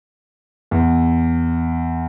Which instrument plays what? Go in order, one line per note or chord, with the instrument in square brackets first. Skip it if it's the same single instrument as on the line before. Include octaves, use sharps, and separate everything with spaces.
[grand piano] E2